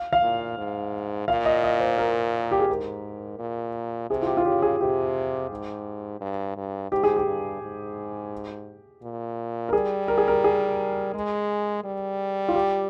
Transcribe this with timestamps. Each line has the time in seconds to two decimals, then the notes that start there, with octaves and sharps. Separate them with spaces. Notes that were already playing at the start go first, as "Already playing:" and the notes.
Already playing: F5
0.13 F5
0.22 A#2
0.58 G#2
1.28 A#2 F5
1.45 D#5
1.64 D#5
1.80 C5
1.98 A#4
2.51 G4
2.60 G#4
2.69 G#2 A#4
3.39 A#2
4.10 C3 G#4
4.22 F4
4.27 G4
4.37 F4
4.45 C#3 G4
4.62 G#4
4.80 C3 G4
5.51 G#2
6.21 G2
6.56 G2
6.92 G#2 G4
7.04 G#4
7.17 G4
7.27 G2
7.62 G#2
9.03 A#2
9.69 A#4
9.73 G3 G#4
10.08 A#4
10.18 G#4
10.28 A#4
10.44 G#4
11.14 G#3
11.85 G3
12.48 F4
12.55 G4